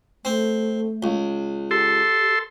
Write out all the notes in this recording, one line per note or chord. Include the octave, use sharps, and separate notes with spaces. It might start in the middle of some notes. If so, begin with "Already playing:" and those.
A3 C4
C#2
G4 A4 C6